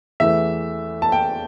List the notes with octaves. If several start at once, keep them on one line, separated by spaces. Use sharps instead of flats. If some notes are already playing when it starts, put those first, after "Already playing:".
E2 E3 A3 E5
A5
G5